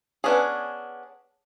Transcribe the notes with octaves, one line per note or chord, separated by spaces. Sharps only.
B3 C#4 D4 G#4